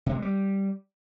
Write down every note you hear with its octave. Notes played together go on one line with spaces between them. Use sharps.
C3
G#3
G3